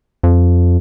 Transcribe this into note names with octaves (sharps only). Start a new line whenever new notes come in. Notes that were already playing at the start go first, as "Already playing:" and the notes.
F2